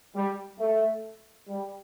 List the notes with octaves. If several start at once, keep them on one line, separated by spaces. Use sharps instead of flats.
G3
A3
G3